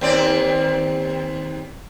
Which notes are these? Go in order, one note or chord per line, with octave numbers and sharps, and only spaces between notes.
D#2 C4 D5